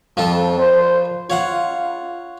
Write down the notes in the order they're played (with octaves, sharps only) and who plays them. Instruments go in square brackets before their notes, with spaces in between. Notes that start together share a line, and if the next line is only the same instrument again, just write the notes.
[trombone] F2 [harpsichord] F3 F4 A4
[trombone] C5
[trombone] F4 [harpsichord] C#5 F5 F#5